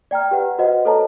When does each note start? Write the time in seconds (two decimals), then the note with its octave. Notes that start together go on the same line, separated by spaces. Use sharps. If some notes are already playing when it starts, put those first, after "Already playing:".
0.11 D5 G5 A#5 F6
0.31 G4 B4 F#5
0.59 F#4 B4 C5 D#5 F#5
0.85 A4 C5 C#5 D#5 A5 A#5